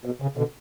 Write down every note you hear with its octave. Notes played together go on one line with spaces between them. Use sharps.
B2
C#3
B2 D3